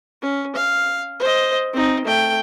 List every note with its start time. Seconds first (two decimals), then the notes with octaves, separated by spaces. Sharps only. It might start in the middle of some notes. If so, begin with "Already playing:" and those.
0.22 C#4
0.56 F5
1.20 C5 D#5
1.73 C4 D#4
2.05 A3 G5